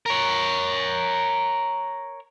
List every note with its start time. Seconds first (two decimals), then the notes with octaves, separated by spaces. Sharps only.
0.06 A#4 C#5